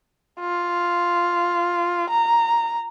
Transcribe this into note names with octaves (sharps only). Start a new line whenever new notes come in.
F4
A#5